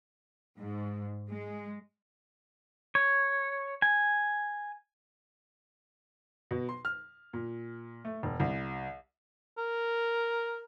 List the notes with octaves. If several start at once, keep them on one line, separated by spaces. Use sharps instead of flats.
G#2
G#3
C#5
G#5
B2
C6
F6
A#2
A3
E1
C2
A#4